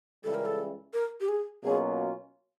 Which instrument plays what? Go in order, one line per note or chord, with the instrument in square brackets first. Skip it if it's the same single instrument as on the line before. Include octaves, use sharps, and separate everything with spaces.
[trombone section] C#2 C#3 E3 G3 [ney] A4
[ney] A#4
A4
A#4
G4
G#4
[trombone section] B2 F#3 A#3 C#4 F4 [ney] G#4